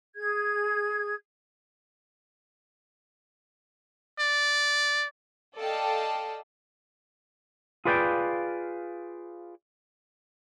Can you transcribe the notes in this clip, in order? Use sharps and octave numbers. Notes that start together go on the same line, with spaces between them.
G#4 G#6
D5
A4 D5 D#5 F5 G5 A5
F4 G#4 B4 D5 F5 G5